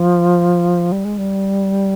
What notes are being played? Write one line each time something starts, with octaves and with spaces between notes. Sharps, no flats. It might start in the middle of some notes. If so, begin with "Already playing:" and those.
Already playing: F3
G3
G#3
G3